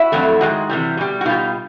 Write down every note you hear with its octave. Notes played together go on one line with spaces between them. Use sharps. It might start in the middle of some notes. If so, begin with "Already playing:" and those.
Already playing: E4 F#4
F2 D3 F#3 A3
G#2 D#3 G#3 F#4
C3 E3 G3
B2 G3
F#4
B2 G3 D#4 F4